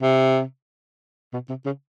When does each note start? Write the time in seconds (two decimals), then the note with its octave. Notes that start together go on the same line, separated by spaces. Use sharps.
0.02 C3
1.33 B2
1.49 C3
1.66 C#3